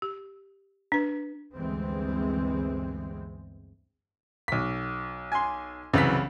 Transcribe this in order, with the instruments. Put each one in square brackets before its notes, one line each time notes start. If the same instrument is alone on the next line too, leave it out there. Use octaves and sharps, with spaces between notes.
[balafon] G4
D4 B4
[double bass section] G1 D2 E3 G#3 C4
[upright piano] B1 B6
[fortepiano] G#5 C6
[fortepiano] C2 F#2 E3 [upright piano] C#3 B6